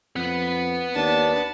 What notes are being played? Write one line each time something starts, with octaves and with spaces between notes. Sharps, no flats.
F2 B4 F#5
D#2 D4 A5